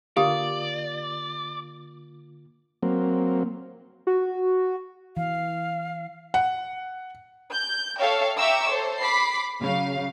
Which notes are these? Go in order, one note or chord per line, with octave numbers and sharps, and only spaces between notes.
D3 A#3 F4 G4 D5 F5 D#6
F#3 A#3 C4
F#4
E3 F5
F#5
G6
A4 C#5 E5 F5 G5
E5 G5 A#5 C#6 D6 E6
A4 C5 C#5
B5 D6 B6 C7
C#3 F#3 F5